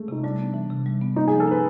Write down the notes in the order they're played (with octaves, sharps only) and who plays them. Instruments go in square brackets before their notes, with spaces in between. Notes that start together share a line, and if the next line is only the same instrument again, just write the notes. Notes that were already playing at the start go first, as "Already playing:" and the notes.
Already playing: [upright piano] G#3 A3
[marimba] C3 [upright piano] D#4
[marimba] G3 [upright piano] D4
[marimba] B3
E3
C3
G3
B3
[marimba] A#3 [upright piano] D#4
[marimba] F3 [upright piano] G#4
[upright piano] A4
[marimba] D4 [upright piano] B4